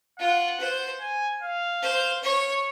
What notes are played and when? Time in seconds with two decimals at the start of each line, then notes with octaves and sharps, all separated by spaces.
0.19 F4 F#5
0.60 C5
1.01 G#5
1.42 F5
1.83 C5
2.23 C#5